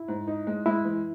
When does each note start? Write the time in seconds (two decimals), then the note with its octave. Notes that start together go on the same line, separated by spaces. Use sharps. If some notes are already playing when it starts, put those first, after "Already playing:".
Already playing: E4
0.08 G#2
0.27 D#4
0.47 G#3
0.66 G#3 E4
0.85 E3